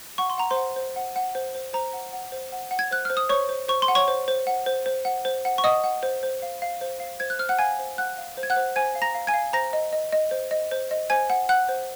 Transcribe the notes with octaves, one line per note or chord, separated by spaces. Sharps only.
F#5 C#6
C6
F#5 A#5
C5 C6
F#5
C5
F#5
F#5
C5
C5
C5 A#5
F#5
F#5
C5
F#5
F#5
G#6
C5 F#6
C5 F6
D#6
C5 C#5 C#6
C5
C5 C#6
C6
F#5
C#5 C#6
C5
C5
F#5
C5
C5
F#5
C5
F#5
C#6
D#5 F#5 D#6
F#5
C5
C5
F5
F5
C5
F5
C5 G#6
F#6
C5 F6
F#5 F#6
F5 G#5 G#6
C5
F5 F#5 F#6
F5
C5
G#6
F#5 F#6
C5
C5 G#5 G#6
F5
A#5 A#6
F5
G#5 G#6
F5
C5 A#5 A#6
D#5
D#5
D#5
C5
D#5
C5
D#5
C5 G#5 G#6
F#5
F#5 F#6
C5